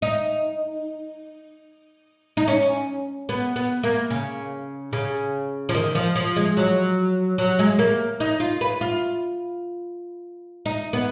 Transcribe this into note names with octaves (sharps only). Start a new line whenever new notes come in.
D#4
D#4
C#4
B3
B3
A#3
C#3
C#3
F3
D#3
F3
F3
G#3
F#3
F#3
G#3
A#3
D#4
F4
B4
F4
D#4
B3